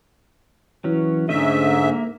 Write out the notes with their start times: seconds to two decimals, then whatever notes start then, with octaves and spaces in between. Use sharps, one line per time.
0.84 E3 F#3 C#4
1.29 G#2 D3 A3 C#4 D#5 E5
1.83 A#3